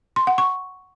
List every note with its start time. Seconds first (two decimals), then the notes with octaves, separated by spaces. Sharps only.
0.16 C6
0.27 F#5
0.38 C#6